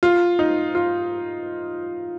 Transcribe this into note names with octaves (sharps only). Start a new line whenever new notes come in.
F4
D#4
F4